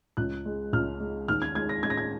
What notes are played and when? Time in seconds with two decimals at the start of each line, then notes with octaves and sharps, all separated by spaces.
0.17 C#2 F#6
0.46 G#3
0.73 C#2 F6
1.00 G#3
1.28 D#2 F6
1.42 G#6
1.55 G#3 G#6
1.69 A#6
1.83 G#3 G#6
1.90 A#6
1.97 G#6